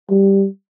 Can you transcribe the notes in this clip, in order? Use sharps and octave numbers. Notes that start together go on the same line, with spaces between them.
G3